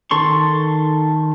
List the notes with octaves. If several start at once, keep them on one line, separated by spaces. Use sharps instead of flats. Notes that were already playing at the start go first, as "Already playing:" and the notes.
D#3 A4 C6 C#6